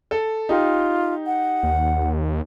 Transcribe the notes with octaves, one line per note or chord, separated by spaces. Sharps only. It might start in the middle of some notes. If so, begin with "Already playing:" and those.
A4
D#4 F4 G4
F#5
D#2